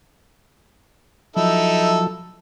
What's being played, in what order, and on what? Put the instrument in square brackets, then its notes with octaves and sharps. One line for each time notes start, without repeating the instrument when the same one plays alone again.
[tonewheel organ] F3 F#3 [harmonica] D#4 E4 A4